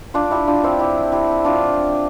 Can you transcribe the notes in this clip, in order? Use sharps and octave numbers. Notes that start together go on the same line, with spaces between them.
D4 F4
E4 G4
D4 F4
C4 E4
E4 G4
E4 G4
D4 F4